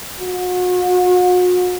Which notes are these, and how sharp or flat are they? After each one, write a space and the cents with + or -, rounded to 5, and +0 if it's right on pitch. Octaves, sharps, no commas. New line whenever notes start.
F#4 -40